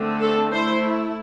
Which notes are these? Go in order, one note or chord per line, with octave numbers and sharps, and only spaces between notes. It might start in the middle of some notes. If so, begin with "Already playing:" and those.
Already playing: D3 A3 C4
A4
A3 E4 C5